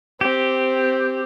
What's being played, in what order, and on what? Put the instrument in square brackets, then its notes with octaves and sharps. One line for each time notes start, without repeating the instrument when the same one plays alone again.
[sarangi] C4 [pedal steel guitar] G4